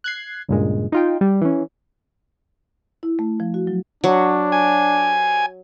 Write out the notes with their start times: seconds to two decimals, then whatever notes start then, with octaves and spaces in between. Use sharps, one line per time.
0.04 F#6 G#6 C7
0.49 C#2 G2 A#2 G#3
0.92 D#4 F4 G5
1.21 G3
1.42 E3 C#4
3.03 E4
3.19 A3
3.40 F3
3.54 F#4
3.67 F#3
4.04 F#3 D4
4.52 G#5